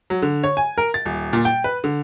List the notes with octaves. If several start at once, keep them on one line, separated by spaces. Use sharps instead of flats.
F#3
D3
C#5
G#5
A#4
A6
D#1
A#2
G5
B4
D3